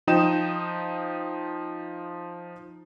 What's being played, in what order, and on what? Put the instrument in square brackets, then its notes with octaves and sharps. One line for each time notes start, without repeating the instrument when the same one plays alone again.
[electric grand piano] F3 D#4 G5 D#6 E7